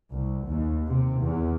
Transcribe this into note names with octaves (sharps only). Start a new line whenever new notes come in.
C2
D#2
C3
E2